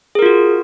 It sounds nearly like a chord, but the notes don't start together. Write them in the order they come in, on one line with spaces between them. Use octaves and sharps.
G#4 A#4 F4 F#4